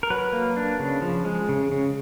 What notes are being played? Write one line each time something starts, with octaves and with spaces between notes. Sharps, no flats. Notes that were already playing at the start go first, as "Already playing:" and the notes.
A#4
F#3 B4
A#3
D4
C#3
F3
G#3
C#3
C#3